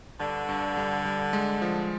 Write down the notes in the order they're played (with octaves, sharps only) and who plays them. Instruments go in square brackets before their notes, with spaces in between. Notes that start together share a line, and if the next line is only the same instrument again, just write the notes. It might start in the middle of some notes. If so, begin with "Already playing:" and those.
[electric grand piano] G2 [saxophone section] D3
[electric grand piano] G2
G3
G3
G#3
F3